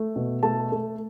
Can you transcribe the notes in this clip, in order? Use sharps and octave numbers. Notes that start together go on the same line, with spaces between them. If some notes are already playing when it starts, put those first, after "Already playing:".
Already playing: A3
B2
A3 A5
A3